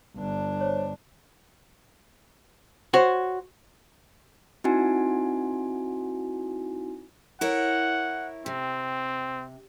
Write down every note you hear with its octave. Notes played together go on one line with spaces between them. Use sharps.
G1 D4
C5 C#5
F#4 C5 C#5
C4 D#4 E4 F#4 G#5
E4 A#4 C#5 F#5
C3 C4